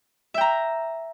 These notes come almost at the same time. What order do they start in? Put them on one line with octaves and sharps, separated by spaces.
E5 G5 A#5